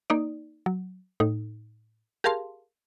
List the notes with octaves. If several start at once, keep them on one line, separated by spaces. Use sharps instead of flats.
A#3 D#4 D5
F#3
A2 D#4
G4 G#4 A#4 F5 A5 C6